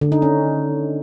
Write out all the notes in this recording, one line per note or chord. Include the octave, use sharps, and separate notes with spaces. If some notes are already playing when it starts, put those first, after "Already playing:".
D3
D#4
C#4